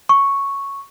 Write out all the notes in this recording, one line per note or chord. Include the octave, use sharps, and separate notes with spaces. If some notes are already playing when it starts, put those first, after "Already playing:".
C#6